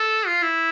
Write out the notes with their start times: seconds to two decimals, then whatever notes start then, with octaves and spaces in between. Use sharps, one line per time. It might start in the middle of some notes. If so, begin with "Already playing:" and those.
Already playing: A4
0.27 F4
0.43 E4